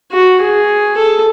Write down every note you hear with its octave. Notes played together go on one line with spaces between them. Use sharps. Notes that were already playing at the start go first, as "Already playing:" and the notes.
F#4
G#4
A4